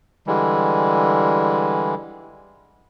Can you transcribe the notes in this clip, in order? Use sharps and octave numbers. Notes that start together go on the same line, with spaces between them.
D3 E3 G3 G#3